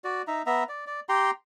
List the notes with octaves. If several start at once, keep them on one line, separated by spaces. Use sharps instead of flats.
F#4 D5
D#4 E5 A#5
B3 E5 A#5
D5
D5
G4 G5 A#5 C6